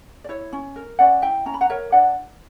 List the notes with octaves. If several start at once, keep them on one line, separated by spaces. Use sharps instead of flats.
D5
E4 C#5
C#4
A#4
C#4 D5 F#5
E4 E5 G5
C#4 A#5
B5
F#5 A#5
A#4 C#5 E5
D4 D5 F#5